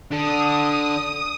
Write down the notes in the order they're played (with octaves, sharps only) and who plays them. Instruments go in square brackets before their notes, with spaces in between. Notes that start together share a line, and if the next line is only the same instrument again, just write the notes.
[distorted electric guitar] D4 A4 [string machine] D#6